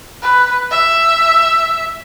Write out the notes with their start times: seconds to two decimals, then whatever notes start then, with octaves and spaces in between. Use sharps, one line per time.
0.22 B4
0.71 E5